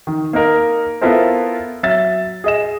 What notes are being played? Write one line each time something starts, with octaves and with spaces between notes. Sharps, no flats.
D#3
A#3 D#4 A#4
B3 E4 F4 A4 A#4 C5
F#3 E5 A6
G#4 D#5 E7